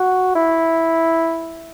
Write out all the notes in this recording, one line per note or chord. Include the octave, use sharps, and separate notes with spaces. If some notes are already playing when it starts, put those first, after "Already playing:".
Already playing: F#4
E4